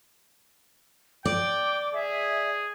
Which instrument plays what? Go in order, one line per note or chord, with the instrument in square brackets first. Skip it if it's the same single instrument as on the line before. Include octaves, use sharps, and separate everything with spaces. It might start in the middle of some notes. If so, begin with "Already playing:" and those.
[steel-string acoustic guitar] D5 [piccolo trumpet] G5 [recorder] D6
[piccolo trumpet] G#4 [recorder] E5